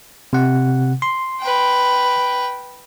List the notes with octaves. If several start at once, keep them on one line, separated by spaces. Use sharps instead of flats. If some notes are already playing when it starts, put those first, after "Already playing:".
C3 F#5
C6
B4 G5